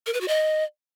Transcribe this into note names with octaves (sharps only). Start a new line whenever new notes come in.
A#4
B4
F#4
D#5